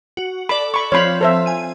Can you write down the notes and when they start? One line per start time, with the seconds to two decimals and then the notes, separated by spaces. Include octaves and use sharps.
0.17 F#4
0.49 A4 D5 B5
0.74 B5 C#6
0.92 F3 C4 F4 C#5 B5
1.21 A4 C5 E5
1.46 G#5 D#7